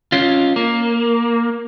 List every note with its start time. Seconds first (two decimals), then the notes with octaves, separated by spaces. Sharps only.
0.12 C#4 F4
0.56 A#3